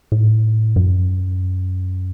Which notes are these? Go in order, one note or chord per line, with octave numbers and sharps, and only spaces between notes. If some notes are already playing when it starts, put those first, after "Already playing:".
A2
F#2